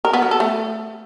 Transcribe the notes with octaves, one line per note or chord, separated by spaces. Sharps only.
A#4
B3
F#3
A4
A3